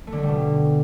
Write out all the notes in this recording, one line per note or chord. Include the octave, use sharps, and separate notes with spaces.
A3
D3
A3
G3
B2